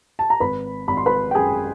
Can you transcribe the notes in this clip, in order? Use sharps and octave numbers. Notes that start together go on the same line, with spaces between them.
A5
A#5
G#1 B4 B5
G#1 B5
C6
B4 B5
G5
F#2 G#4 G#5